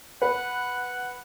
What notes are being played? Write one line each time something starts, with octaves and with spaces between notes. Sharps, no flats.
B4 F#5